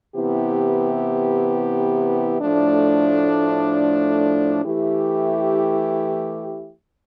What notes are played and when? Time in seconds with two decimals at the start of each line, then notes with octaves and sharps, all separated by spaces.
0.14 C3 E3 B3 E4 G4
2.40 A2 F3 A3 D4
4.64 E3 A3 E4 G4